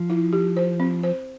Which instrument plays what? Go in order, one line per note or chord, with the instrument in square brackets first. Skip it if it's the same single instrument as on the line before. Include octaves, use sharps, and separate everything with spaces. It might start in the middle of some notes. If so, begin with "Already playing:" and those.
Already playing: [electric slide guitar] F3
[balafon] E4
G4
C5
C4
C5